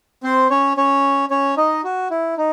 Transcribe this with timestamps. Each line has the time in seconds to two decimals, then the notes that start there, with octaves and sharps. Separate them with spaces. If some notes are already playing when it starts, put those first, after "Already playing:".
0.23 C4 C5
0.50 C#4 C#5
0.77 C#4 C#5
1.31 C#4 C#5
1.57 D#4 D#5
1.84 F#4
2.11 E4
2.38 D#4